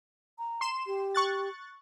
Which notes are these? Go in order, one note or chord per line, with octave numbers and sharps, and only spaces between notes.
A#5
C6 E7
G4
C#6 F#6 A6